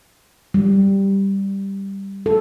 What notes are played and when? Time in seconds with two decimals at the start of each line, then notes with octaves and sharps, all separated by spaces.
0.54 G3
2.26 A4